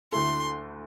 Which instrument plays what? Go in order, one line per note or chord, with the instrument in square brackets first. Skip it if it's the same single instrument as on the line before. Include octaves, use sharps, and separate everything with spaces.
[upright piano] D2 D3 A3 E4 A4 [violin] C6